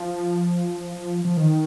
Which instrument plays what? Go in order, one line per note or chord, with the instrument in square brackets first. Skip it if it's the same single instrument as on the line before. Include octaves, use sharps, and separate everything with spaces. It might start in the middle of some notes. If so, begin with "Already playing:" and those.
Already playing: [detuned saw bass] F3
F3
D#3